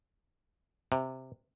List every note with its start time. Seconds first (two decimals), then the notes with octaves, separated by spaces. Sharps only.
0.92 C3